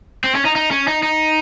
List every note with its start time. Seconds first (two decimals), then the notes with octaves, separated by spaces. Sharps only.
0.24 C4
0.35 C#4
0.45 D#4
0.56 D#4
0.71 C#4
0.88 D#4
1.03 D#4